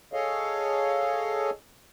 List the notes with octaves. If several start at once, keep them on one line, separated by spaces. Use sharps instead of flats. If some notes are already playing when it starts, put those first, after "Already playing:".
G#4 A4 C#5 D#5 F5